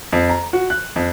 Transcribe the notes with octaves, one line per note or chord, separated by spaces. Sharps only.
F2
A#5
F#4
F#6
F2